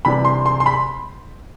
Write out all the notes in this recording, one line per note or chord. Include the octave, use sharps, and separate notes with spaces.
C3 E3 G3 D4 B5
C6
C6
C6
B5